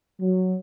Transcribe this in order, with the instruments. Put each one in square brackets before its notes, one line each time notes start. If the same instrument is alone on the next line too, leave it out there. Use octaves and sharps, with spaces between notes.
[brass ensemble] F#3